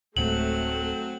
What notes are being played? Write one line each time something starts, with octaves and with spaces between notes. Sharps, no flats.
D1 F#3 G#3 A3 C4 F#7